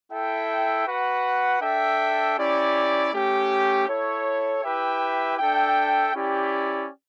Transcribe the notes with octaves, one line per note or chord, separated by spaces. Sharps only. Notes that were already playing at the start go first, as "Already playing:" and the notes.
E4 A4 E5 G5
F#4 B4 F#5
D4 A4 E5 G5
C#4 E4 G4 D5
A3 C#4 G4
E4 A4 C#5
E4 G4 B4 E5 G5
D4 A4 E5 G5
C#4 E4 G4 D5